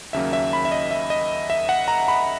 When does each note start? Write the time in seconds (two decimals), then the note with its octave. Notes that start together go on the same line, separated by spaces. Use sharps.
0.13 D#2 C#3 F#3 A#3 C#4 E5
0.33 E5
0.53 B5
0.65 E5
0.72 D#5
0.91 E5
1.10 D#5
1.50 E5
1.69 F#5
1.88 A#5
2.08 B5